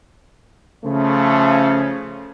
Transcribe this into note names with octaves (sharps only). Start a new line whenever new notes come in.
C#3 F3 A3